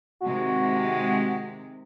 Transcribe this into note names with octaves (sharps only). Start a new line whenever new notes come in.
C3 D#3 G#3 F#4